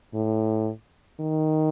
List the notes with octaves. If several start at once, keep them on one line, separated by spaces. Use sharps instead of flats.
A2
D#3